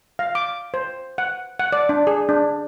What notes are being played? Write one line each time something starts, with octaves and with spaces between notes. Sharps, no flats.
F5
D6
C5
F#5
F#5
D5
D4
G#4
D4